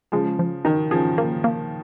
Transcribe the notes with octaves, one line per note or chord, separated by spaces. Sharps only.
C#3 F3 G#3
F3
D#3 D#4
C#3 F3 G#4
A#3
A#3